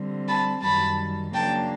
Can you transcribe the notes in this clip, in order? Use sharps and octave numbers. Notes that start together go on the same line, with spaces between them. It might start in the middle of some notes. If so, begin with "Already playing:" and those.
Already playing: D3 G3 C4
A5 B5
F#2 D#3 G3 A5 B5
C#3 F#3 A#3 D4 G5 A5